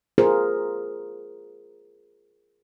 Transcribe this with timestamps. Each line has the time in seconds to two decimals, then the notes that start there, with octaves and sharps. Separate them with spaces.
0.18 F4 G#4 A#4 C5